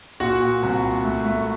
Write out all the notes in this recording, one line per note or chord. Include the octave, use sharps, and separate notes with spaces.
A#2 F#4 F#5
A#2
C2
A#2
A3
A3